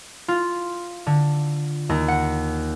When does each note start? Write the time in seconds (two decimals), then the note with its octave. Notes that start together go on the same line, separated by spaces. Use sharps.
0.28 F4
1.07 D3
1.89 D#2
2.08 F#5